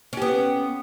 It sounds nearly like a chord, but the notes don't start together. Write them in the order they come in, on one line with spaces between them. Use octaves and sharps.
C#4 G4 B3